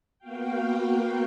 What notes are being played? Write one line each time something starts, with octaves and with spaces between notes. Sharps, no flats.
A#3 B3 F#4 F5 G5